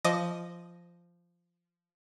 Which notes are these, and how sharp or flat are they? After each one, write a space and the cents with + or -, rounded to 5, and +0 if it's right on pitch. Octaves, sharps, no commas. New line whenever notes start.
F3 -10 D#5 +0 D6 +0